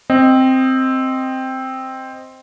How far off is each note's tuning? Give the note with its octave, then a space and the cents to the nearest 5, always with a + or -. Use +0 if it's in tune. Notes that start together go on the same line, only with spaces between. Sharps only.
C4 +0 D#5 +0